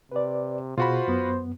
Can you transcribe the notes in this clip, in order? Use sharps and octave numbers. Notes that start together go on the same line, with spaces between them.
C3 B4 D5
B2 F4 F#4 G#4 C5 B5
F#2 B3